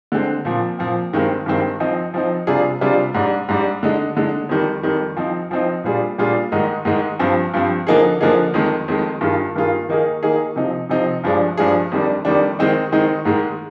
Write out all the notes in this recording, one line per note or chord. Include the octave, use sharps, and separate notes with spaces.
D3 G#3 C4
A#2 F3 C4
A#2 F3 C4
G2 D#3 G#3 C4
G2 D#3 G#3 C4
F3 C4 D#4
F3 C4 D#4
C3 G3 D4 F4 G#4
C3 G3 D4 F4 G#4
G#2 G3 D4
G#2 G3 D4
D3 G#3 D#4
D3 G#3 D#4
F2 D#3 G3
F2 D#3 G3
F3 C4 D#4
F3 C4 D#4
A#2 G3 D4 F4 G#4
A#2 G3 D4 F4 G#4
G#2 D#3 G#3 D#4
G#2 D#3 G#3 D#4
G2 F3 C4
G2 F3 C4
D3 F3 A#3 D#4 G#4
D3 F3 A#3 D#4 G#4
F2 D#3 G#3
F2 D#3 G#3
G2 D#3 A#3 F4 G#4
G2 D#3 A#3 F4 G#4
D#3 A#3 D#4 G#4
D#3 A#3 D#4 G#4
C3 F3 C4 D#4
C3 F3 C4 D#4
G2 F3 G#3 D4 G#4
G2 F3 G#3 D4 G#4
F2 D#3 G3 D4
F2 D#3 G3 D4
D#3 G#3 C4 D#4
D#3 G#3 C4 D#4
G#2 D#3 G#3